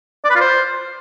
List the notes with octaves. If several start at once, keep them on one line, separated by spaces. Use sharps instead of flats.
D5
B4
F4
C5